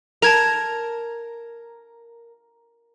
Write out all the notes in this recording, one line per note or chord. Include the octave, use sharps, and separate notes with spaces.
A#4 A5 G#6 F7